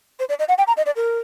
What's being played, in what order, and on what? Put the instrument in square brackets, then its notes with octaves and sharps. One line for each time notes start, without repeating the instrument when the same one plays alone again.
[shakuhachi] C5
D5
D#5
F#5
G5
A#5
D#5
D5
A#4